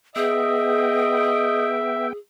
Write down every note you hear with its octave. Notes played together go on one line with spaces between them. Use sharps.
B3 G#4 D#5 E5 G5